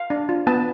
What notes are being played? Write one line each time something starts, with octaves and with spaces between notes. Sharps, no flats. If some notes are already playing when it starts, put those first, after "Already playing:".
Already playing: F5
D4
F4
B3 A5